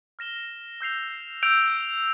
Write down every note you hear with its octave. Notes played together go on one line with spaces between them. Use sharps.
F6 A#6 E7 G7
E6 G6 C7 F7
E6 G6 D7 F7